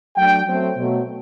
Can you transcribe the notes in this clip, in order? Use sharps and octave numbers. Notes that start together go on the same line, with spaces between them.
F#3 A3 D4 G5
F#3 A3 C4
B2 F#3 A3